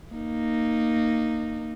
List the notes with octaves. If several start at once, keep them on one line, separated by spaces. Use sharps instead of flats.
A#3 D#4